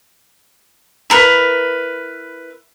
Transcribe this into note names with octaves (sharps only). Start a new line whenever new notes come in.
E4 A#4 B4